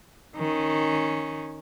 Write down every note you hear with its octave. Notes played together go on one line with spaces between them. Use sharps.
D#3 C#4